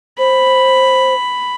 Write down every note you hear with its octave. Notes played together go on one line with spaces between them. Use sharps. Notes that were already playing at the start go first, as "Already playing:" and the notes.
C5 B5